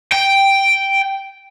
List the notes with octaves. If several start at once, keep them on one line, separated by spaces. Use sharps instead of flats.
G5